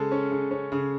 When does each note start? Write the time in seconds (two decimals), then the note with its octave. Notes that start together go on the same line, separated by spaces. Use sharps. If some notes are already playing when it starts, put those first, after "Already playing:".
Already playing: C#3 G#3 A4
0.12 C#4
0.31 C#3
0.51 C#4
0.72 C#3